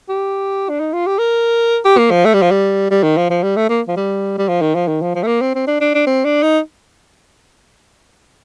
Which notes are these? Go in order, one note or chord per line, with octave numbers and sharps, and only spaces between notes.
G4
D4
D#4
F4
G4
A#4
G4
A#3
F3
A3
G3
F3
G3
G3
D#3
F3
F3
G3
A3
A#3
F3
G3
G3
F3
D#3
F3
D#3
F3
F3
A3
A#3
C4
C4
D4
D4
D4
C4
D4
D#4